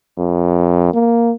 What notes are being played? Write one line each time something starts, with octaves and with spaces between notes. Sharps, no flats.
F2
A#3